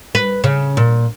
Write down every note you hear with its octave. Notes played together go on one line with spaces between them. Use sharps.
B4
C#3
A#2